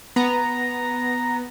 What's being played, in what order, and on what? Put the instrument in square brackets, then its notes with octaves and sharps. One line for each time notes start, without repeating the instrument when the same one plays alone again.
[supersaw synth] B3 [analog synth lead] A#5